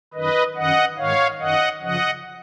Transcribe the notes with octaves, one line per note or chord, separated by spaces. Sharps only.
F#2 D#3 B4 D#5
F#2 D#3 D#5 F#5
G#2 D#3 C#5 F5
F#2 D#3 D#5 F#5
F#2 C#3 F3 D#5 F#5